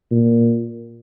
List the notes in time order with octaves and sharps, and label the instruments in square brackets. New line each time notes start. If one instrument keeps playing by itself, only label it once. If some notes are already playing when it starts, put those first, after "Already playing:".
[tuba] A#2